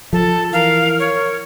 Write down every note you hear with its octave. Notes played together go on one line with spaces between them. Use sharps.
F3 A4
E3 A#4 F5
C#5